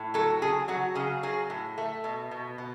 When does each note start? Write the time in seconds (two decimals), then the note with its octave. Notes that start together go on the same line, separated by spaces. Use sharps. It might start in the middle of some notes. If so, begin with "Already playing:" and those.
Already playing: A2
0.14 F#3 A4
0.42 C#3 G#4
0.68 F#3 F#4
0.95 C#3 G#4
1.23 F#3 G#4
1.50 A2
1.78 A3
2.04 B2
2.31 B2
2.58 B2